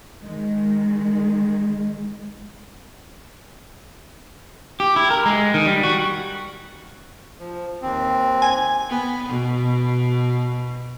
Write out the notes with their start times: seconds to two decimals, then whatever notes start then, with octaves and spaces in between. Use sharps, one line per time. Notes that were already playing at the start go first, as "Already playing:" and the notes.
0.22 D#3 G#3
4.80 G4
4.96 E4
5.10 A#4
5.26 G#3
5.54 D#3
5.66 G3
5.83 F#4
7.39 F3
7.82 D#2 C4
8.42 G#5
8.89 B3
9.29 B2